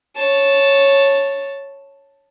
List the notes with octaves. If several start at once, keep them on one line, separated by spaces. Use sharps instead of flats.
C#5 A5